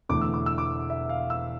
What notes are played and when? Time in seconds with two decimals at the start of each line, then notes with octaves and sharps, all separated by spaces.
0.09 E1 E2 D3 A3 D6
0.21 E6
0.34 D6
0.46 E6
0.58 D6
0.90 E5
1.09 F5
1.30 E6